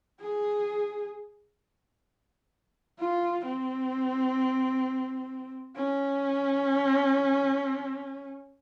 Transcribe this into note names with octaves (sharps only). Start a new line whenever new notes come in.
G#4
F4
C4
C#4